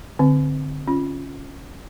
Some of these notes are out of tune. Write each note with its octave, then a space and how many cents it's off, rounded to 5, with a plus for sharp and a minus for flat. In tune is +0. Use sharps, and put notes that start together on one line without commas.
D3 -5 C4 +0
C#4 +0 F4 +0